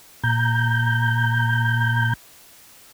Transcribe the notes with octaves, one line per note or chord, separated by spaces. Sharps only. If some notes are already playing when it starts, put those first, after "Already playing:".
A#2 A#5 G6